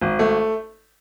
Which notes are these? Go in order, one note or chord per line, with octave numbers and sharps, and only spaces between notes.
G#1
A3